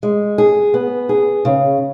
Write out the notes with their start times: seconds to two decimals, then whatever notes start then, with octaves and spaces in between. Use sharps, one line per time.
0.03 G#3
0.38 G#4
0.74 B3
1.09 G#4
1.45 C#3